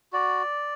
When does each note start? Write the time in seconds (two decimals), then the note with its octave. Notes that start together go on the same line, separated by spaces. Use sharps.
0.13 F#4 D5